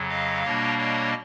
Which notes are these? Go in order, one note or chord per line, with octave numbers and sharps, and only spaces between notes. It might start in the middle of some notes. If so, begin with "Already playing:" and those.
Already playing: F2 C#3 F#3
D#5 F5
B2 G3 A#3 D4 C#5 D#5
C#5 D#5